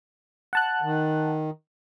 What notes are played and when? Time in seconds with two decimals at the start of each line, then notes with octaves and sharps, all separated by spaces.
0.53 F#5 A5 F#6
0.82 D#3